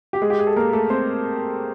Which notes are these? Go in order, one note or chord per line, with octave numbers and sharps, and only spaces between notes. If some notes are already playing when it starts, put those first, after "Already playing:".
G4
G#3 G#4
G4
G#4
A4
A#3 A#4
A3 A4
C4 C5